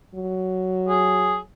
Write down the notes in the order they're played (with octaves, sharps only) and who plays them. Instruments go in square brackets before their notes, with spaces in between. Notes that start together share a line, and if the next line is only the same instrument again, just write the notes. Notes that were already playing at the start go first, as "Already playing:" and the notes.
[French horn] F#3
[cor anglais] G#4